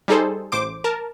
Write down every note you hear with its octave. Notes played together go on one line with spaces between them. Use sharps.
G3 D#4 G#4 A4 C5
A1 C5 D6 D7
A#4 A5